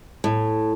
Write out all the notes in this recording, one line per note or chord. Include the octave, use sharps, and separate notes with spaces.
A2